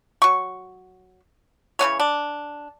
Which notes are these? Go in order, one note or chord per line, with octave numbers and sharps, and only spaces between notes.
F#3 C#6
C#3 E3 B3 C#5
D4